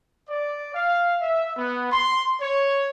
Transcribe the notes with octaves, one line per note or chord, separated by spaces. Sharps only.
D5
F5
E5
B3
C6
C#5